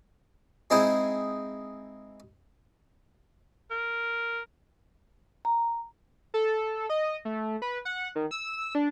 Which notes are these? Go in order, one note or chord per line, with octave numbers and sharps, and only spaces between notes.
G#3 C4 D#4 E4 G#4 C5
A#4
A#5
A4
D#5
A3
B4
F#5
D#3
E6
D4